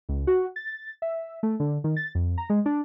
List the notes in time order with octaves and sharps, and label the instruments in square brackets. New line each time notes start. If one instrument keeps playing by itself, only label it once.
[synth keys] C#2
F#4
A6
E5
A3
D3
D#3
A6
F2
A#5
G#3
D4